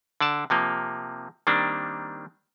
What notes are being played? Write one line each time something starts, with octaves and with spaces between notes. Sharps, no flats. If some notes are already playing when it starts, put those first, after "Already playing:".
D3 D5 A5
C3 F3 A#3
D#3 G3 A#3 C4 D4